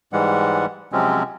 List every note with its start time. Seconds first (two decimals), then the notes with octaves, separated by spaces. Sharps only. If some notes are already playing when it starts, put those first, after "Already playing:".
0.13 G#2 E3 G3 G#3 F#5
0.92 C3 F3 F#3 G#3 C4 C#4